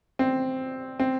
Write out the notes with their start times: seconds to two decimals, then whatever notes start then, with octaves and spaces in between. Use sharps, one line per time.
0.19 C4
1.00 C4